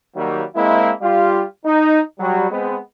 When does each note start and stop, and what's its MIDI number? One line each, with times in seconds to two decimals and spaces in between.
0.15 0.43 51
0.15 0.43 54
0.15 0.43 55
0.15 0.43 58
0.55 0.91 56
0.55 0.91 58
0.55 0.91 60
0.55 0.91 64
1.01 1.43 55
1.01 1.43 65
1.01 1.43 67
1.01 1.43 77
1.65 1.99 63
2.19 2.48 54
2.19 2.48 55
2.50 2.76 56
2.50 2.76 59
2.50 2.76 60